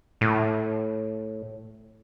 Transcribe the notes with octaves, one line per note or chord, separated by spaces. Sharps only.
A2